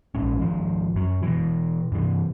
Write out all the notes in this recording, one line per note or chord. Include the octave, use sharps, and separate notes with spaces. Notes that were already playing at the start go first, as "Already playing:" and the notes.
A#1 G#2 C#4
G#1 F3
F#2 F#3
B2 E3
G2 C3 E3